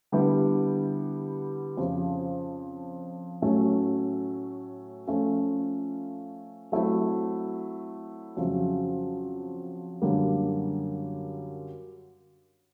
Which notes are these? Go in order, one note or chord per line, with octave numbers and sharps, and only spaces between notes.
D3 G3 B3 E4 G4
F2 C#3 F3
A2 F#3 A3 C#4
F3 A3 C#4 F4 A4
F#3 A3 C4 E4
F2 C#3 F#3
F#2 D3 G3 A#3